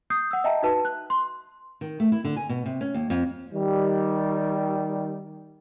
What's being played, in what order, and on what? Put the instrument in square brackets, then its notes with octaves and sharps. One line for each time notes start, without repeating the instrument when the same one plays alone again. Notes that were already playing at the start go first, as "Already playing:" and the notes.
[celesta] D#6 G6 C7
F#5 E6
D#5 E5 G5 A5 A#5
D#4 F#4 B4 A5
F#6
C6
[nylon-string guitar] D#3
A3
E4
D3
G#5
B2
C3
C#4
D#2
F2
[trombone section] D#3 G3